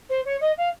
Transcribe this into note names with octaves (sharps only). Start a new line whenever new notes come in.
C5
C#5
D#5
F5